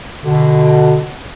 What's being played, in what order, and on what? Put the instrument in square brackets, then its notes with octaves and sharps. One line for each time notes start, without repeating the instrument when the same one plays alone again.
[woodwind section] B2 D3